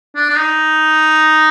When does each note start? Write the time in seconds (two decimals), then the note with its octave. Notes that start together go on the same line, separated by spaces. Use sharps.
0.15 D4
0.29 D4
0.38 D#4